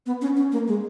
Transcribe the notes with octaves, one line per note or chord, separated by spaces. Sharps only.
B3
C#4
C#4
A#3
G#3